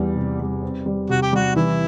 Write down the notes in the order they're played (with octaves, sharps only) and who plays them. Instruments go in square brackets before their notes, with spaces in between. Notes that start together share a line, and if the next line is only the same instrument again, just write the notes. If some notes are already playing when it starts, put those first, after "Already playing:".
Already playing: [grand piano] E2 G3
C3
G3
C4
G3
[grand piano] C3 [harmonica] F#4
[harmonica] G4
[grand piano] G3 [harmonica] F#4
[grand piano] E3 [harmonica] E4